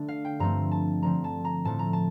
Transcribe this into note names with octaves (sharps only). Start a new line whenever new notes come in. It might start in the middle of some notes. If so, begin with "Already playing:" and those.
Already playing: D3 A3 D4
F5
G5
G2 F3 A3 C4 A#5
A5
D3 F3 C4 A#5
A5
A#5
A2 F3 A3 A5
A#5
A5